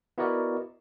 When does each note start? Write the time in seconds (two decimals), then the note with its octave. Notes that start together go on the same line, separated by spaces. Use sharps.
0.18 B3 E4 F#4 A#4 D5 D#5